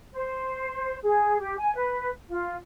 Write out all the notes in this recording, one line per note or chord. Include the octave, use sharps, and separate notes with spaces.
C5
G#4
G4
G#5
B4
F4